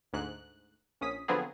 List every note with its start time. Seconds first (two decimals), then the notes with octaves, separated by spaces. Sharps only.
0.13 D2 G#2 F#6
1.01 A#1 C#4 D#6 B6
1.28 D3 F3 F#3 B3 C4 G#4